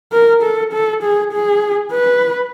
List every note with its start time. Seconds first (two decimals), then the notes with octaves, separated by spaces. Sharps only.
0.12 A#4
0.42 A4
0.73 A4
1.03 G#4
1.32 G#4
1.92 B4